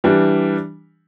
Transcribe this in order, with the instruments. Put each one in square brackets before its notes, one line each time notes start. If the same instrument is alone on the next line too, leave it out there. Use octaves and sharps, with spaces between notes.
[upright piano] E3 G3 D4